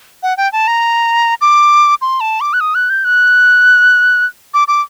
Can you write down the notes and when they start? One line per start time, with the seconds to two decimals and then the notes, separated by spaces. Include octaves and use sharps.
0.23 F#5
0.37 G5
0.53 A5
0.68 A#5
1.41 D6
2.02 C6
2.21 A5
2.41 D6
2.53 F#6
2.60 D#6
2.75 F#6
2.90 G6
3.05 F#6
4.54 D6
4.68 D6